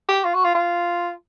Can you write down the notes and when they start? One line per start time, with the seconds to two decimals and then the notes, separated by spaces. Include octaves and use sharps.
0.09 G4
0.25 F4
0.34 F#4
0.44 F4
0.55 F4